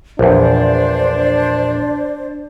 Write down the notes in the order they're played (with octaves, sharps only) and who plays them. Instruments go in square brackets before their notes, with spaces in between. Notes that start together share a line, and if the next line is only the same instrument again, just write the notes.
[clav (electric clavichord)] A#1 E2 [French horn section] D4 [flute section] C5 D5